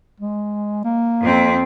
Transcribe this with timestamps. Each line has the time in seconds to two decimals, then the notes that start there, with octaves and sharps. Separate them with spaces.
0.20 G#3
0.84 A#3
1.23 F2 C4